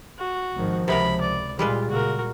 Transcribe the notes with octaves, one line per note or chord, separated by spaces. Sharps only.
F#4
G#1 D#3 F3
C#2 C3 B3 A#4 B5
D5
A#2 G3 G#3 F4 B4
A#2 C#3 F#4 A#4